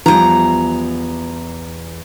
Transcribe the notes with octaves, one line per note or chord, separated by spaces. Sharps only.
E2 F3 G3 A#5